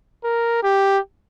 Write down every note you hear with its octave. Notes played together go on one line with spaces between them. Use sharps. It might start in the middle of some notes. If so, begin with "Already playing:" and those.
A#4
G4